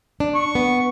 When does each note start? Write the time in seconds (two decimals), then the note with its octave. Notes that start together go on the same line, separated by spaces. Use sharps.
0.20 D4
0.35 C#6
0.55 B3